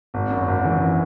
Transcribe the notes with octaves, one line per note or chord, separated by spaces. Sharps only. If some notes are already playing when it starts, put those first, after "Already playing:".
G#1
F#2
G#1
E3